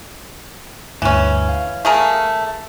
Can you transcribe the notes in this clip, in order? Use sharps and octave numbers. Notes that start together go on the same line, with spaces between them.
D2 G2 E3 C#4
F5
A3 G#4 A#4